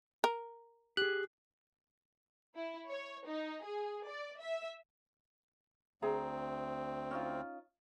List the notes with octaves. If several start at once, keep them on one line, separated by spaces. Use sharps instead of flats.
A#4
G4 G#4 F#6
E4
C#5
D#4
G#4
D5
E5
D2 C4 G#4 E5 A#5
C#4 D#4 F4